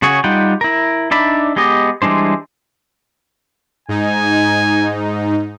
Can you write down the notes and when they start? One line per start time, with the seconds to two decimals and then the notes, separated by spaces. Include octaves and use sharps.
0.02 C#3 F#4 G#4 C#5
0.24 G3 D#4 F4 F#5 G5
0.61 E4 A#4
1.11 D4 D#4 D5 E5 B5
1.56 G#3 B3 G4 D#5
2.02 E3 G3 G#3 D4 C5
3.89 G#2 D#4 G#5